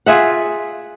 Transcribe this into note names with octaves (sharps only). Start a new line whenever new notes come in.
F4 G#4 E5 F#5